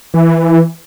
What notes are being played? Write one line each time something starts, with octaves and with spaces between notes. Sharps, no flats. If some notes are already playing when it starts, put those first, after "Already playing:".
E3